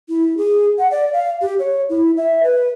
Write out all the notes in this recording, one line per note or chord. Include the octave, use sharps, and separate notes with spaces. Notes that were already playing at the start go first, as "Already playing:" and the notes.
E4
G#4
F#5
D5
F5
G4
C#5
E4
E5
B4